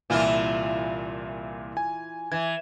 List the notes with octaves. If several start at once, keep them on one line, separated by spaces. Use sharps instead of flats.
C2 A#2 E3 E4 F4
G#5
E3 G#6